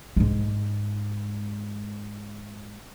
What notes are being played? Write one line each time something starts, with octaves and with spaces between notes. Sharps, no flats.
G#2 G#3